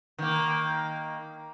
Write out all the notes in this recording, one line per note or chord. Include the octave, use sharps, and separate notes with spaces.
D#3 A#3